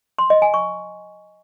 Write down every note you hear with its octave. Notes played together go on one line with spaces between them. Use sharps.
C6
D#5
G#5
C#6